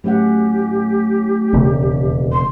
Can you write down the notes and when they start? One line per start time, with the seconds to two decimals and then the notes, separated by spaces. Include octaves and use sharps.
0.04 A2 F#3 C#4 G4 F#5
1.53 E1 D#2 C#3
2.32 C6